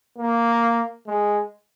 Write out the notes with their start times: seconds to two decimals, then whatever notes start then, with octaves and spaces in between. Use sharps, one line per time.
0.18 A#3
1.07 G#3